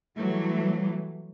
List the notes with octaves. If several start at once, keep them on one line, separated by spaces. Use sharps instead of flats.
E3 F#3 G3 A3